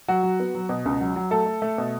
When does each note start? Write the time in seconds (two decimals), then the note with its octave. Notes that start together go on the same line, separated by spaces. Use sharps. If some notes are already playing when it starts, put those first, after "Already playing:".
0.08 F#3 F#4
0.23 F#3
0.40 B3
0.55 F#3
0.69 B2
0.86 C#2
1.01 F#3
1.16 F#3
1.31 A3 A4
1.46 A3
1.62 A3
1.78 B2